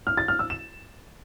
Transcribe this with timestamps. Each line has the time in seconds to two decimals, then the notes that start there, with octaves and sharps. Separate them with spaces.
0.07 F6
0.17 A6
0.28 F6
0.39 E6
0.50 E7